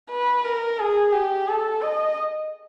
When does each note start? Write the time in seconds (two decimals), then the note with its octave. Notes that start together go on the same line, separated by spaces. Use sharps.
0.11 B4
0.44 A#4
0.79 G#4
1.13 G4
1.48 A4
1.82 D#5